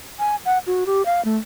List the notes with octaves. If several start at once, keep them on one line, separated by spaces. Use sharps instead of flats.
G#5
F#5
F#4
G4
F5
A3